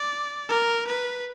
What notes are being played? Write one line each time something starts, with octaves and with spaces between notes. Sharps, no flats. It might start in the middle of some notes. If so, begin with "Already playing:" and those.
Already playing: D5
A#4
B4